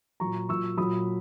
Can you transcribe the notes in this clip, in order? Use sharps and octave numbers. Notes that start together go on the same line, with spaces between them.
A#2 F#3 A#5 C#6
A#2 F#3 C#6 E6
A#2 F#3 B5 D#6